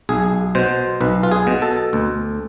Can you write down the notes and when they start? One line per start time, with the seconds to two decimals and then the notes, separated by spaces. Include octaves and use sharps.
0.09 B1 G#4
0.55 B2 C5
1.01 B1 B4
1.23 F4
1.31 G#4
1.47 B2
1.62 A4
1.93 D2